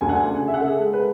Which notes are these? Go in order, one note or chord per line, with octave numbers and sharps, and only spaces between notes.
D2 G#5
F#5
G#5
C#3
E5
C#3 F#5
A4
G#4
G#3
B4